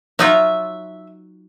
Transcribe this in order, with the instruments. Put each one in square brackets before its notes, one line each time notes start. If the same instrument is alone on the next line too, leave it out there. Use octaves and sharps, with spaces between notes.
[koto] F#3 D#4 F4 [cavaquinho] E5